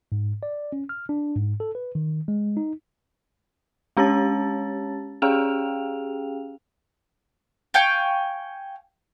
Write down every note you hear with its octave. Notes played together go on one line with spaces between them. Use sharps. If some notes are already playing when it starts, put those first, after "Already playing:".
G#2
D5
C#4
F6
D4
G#2
A4
B4
D#3
G#3
D#4
G#3 C#4 G4 C#5 A5 A6
C#4 G4 G#4 F5 G5 F7
F5 G5 G#5 C#6